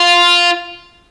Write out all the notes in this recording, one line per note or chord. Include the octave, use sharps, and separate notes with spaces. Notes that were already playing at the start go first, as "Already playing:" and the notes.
Already playing: F4